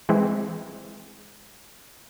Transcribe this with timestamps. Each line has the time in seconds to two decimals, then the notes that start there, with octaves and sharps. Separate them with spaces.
0.09 E3 G#3 C4